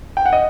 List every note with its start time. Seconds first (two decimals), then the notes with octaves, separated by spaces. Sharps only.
0.17 G5
0.26 F#5
0.33 D#5